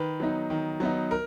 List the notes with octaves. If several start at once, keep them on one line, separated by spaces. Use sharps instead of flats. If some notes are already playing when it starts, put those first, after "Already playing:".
Already playing: D#3 B4
F#3 B3 D#4
D#3
F#3 B3 D#4
A#4